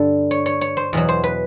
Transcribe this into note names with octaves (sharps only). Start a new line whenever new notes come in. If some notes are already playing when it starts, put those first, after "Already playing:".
Already playing: G2 D3 G3 A4
C#5
C#5
C#5
C5
E2 B2 F#3
C5
B4